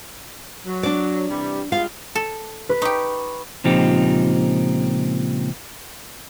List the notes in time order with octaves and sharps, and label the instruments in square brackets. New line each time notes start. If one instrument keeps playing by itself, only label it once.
[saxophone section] F#3
[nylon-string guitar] D4 D5
[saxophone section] C3 E3 G3
[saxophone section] G3 G#3 F4 [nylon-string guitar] F5
[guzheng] A4
[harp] B4
[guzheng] D#4 G4 [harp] C#6
[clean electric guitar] C#2 A#2 F3 C4 D#4 G4